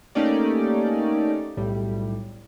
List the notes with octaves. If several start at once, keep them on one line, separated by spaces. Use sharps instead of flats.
A3 A#3 C#4 D#4 G4 D5
B1 A2 G3